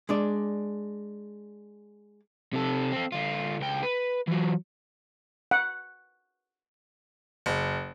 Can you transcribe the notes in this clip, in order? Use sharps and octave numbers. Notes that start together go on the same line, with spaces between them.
G#3 D4 D5
C3 A4
C4 A4
D3 F4
C#2 G5
B4
E3 F#3
F#5
F#1